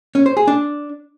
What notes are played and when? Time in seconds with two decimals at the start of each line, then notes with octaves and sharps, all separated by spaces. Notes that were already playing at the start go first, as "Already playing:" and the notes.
0.15 C#4
0.26 C5
0.37 G#4
0.48 D4